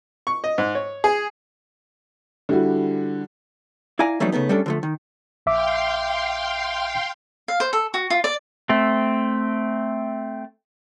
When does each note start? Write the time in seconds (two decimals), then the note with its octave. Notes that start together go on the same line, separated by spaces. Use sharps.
0.27 C#6
0.44 D#5
0.58 G#2
0.75 C#5
1.04 G#4
2.49 D3 G3 E4 F#4
3.99 E4 D5 F5 G#5 A#5
4.20 E3 F#3 G3 A3 B3 D#4
4.32 C#3 A3 B3 D#4
4.49 G3 A3 C#4 D4 A4
4.66 D3 F3 A3
4.83 D#3
5.46 A#1 E5 F5 G5 C6 D6
7.48 F5
7.60 C5
7.73 A4
7.94 F#4
8.10 F4
8.24 D5
8.69 A3 C4